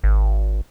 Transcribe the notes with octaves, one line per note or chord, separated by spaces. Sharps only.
G#1